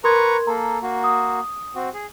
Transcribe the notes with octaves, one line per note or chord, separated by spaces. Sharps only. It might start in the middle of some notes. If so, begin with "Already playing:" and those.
A#4 B4 A#5 C6 C#6 G#6
A#3 A4 A#5
A#3 F#4
D#6
C4 F#4
G#4